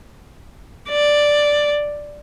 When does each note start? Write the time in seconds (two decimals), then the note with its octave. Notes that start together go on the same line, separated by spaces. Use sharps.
0.90 D5